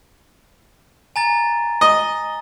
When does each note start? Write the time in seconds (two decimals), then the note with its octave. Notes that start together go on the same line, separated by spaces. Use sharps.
1.16 G#5 A#5 A6
1.81 D#5